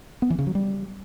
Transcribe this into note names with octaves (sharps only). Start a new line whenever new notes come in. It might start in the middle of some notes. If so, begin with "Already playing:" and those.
B3
E3
C#3
F#3
G3